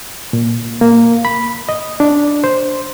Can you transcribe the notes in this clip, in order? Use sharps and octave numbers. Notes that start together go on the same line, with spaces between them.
A#2
A#3
B5
D#5
D4
C5